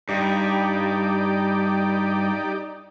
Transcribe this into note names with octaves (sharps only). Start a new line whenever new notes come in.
G2 D#4 G4 D5